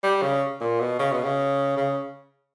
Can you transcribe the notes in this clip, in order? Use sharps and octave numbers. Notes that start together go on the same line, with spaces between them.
G3
C#3
A#2
B2
C#3
B2
C#3
C#3